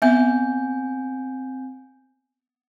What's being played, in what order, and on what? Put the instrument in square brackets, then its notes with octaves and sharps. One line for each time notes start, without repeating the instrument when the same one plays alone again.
[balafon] B3 E5 [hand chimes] C4 G#5 G6